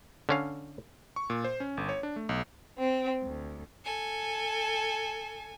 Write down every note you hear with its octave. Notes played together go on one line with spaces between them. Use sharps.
D3 C#4 F5
C#6
A#2
C5
C#4
G1
C#5
D4
A3
B1
C4
D2
A4 G#5